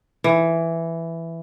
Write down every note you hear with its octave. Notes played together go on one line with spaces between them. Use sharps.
E3